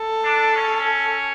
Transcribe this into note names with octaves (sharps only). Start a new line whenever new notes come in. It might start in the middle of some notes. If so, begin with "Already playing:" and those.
Already playing: A4
D4
C#4